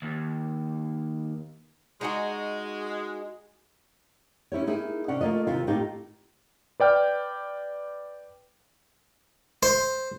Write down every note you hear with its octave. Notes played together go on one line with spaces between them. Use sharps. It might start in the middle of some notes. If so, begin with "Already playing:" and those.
D#2
G#3 D#4 F#4 G#4
C#4 E4 G4 C#5
A#3 D#4 E4 G#4
C3 C#4 D4 F#5
A3 A#3 F4 D#5
D#2 C3 F4
A2 C4 D#4 F4 G4
B4 D5 G5 F6
C5